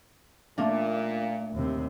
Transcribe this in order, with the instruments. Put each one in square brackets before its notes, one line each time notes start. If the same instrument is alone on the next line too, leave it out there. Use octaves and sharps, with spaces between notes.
[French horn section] A#2 [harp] A3 A#3 D4
[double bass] D#2 C3